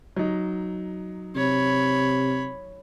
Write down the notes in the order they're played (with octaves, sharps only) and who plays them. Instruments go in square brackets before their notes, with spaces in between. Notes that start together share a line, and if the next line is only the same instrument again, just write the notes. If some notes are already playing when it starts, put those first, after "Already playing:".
[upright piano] F#3 D#4
[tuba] C3 [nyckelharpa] C#5 B5